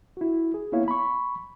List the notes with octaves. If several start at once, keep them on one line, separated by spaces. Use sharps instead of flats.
E4 F#4
G#4
A#3 B3 E4 C#5 F5
B5 C#6